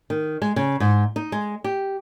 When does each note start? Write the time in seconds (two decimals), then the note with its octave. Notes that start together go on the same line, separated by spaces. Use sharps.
0.10 D#3
0.42 G#3
0.56 C#3
0.80 G#2
1.16 D#4
1.32 G#3
1.64 G4